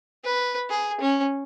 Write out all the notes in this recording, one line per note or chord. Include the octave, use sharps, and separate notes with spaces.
B4
G#4
C#4